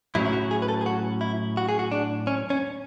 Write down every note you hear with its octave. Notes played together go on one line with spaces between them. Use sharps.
A2 F#3 C#4 E4
E4
F#4
G#4
B4
A4
G#4
F#4
E4
F#4
G#4
F#4
D4
C#4
C#4